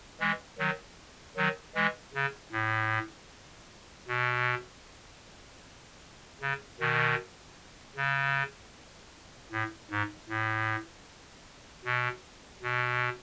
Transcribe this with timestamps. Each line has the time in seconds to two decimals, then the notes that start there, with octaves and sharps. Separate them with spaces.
0.20 E3 G#3
0.59 D#3 F#3
1.36 D#3 F#3
1.75 E3 G#3
2.14 C#3
2.52 A2
4.08 B2
6.41 C#3
6.80 B2 D#3
7.96 C#3
9.52 A2
9.91 G#2
10.29 A2
11.85 B2
12.62 B2